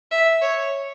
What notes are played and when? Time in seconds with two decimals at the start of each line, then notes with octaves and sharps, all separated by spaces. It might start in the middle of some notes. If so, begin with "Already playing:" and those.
0.11 E5
0.42 C#5